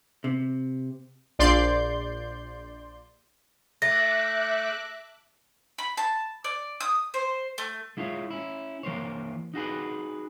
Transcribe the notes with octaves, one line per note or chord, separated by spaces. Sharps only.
C3
A#1 D5 C6 G6
A3 E5 D6 F#6 A#6
B5
A5
D5
D#6
C5
A3
G#3 E4 F4 C#5
C#4 E4
E3 A#3 C5 C#5
D#4 F#4 G#4 B4